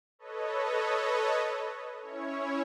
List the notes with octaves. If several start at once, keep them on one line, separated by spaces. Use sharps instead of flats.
A4 B4 C#5 D#5
C#4 E4 C#5